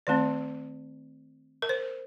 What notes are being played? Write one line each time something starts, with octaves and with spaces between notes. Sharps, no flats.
D#3 A3 C4 D5
A#4
C5